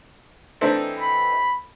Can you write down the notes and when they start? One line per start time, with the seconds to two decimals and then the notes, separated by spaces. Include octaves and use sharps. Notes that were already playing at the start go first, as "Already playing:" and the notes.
0.61 E3 A3 C4 D4 D#4 G4
0.99 B5